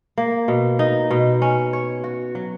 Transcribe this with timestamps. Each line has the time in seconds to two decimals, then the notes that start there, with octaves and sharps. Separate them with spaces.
0.18 A#3
0.48 B2
0.79 D#4
1.10 B2
1.42 C#4
1.73 C#5
2.04 F#4
2.35 F#3